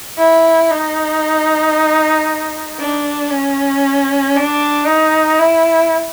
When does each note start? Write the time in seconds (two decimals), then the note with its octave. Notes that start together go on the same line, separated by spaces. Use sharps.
0.18 E4
0.71 D#4
2.79 D4
3.31 C#4
4.36 D4
4.87 D#4
5.39 E4